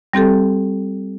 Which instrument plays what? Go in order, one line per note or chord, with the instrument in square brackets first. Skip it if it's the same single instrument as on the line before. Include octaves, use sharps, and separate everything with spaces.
[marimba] G3 C4 G4 A4